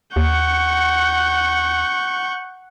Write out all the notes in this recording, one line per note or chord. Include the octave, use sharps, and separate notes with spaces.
D#2 F#5 C#6 G6